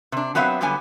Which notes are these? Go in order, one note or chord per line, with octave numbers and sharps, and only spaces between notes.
C3 D4
F#3 B3 C4 E5 F5
D3 F#3 G3 B3 G#5